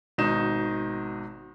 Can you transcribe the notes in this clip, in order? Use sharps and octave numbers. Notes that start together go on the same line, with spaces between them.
G#1 B2 D#4 E7